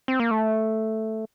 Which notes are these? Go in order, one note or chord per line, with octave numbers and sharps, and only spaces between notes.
C4
A#3
A3